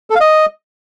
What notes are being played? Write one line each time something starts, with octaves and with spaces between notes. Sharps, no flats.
A4
F5
D#5